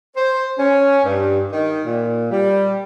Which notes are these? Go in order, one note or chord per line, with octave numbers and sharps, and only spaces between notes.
C5
C#4
G2
D#3
A#2
G3